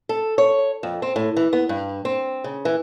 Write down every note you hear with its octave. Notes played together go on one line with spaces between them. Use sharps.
A4
C#5
F2
C4
A2
E3
B3
G2
C4
C#3
E3